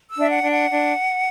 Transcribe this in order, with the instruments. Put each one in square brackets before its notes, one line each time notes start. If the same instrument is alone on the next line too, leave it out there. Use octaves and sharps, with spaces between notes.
[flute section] E6
D4 E5
F#5
D4
F#5
D4